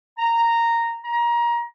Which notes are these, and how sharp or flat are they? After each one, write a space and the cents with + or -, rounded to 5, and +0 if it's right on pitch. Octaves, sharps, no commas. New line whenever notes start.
A#5 -10
A#5 +25